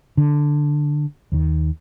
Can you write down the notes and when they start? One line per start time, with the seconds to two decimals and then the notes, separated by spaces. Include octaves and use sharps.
0.17 D3
1.32 D#2 D#3